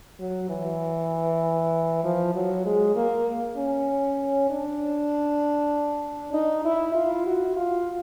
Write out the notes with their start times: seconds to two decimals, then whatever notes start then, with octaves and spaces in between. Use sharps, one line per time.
0.19 F#3
0.49 E3
2.04 F3
2.35 F#3
2.65 G#3
2.96 A#3
3.57 C#4
4.50 D4
6.33 D#4
6.65 E4
6.95 F4
7.26 F#4
7.56 F4